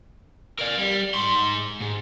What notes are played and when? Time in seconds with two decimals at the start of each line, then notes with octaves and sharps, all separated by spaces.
0.59 A#4 D5
0.78 G3
1.14 G#2 C6
1.81 G#2